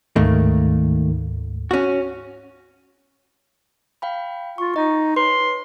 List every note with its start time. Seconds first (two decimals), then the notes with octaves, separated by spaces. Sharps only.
0.16 D2 G#2 D#3 A3 A#3
1.71 C#4 F#4
4.02 F5 G5 B5
4.58 F4 C#6
4.76 D#4 D#5
5.16 B4 C#5 C6